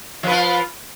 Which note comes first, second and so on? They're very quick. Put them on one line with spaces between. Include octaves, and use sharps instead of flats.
F3 B4 F4